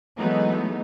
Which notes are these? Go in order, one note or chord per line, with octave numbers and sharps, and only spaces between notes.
E3 F#3 G#3 A3 B3 D#4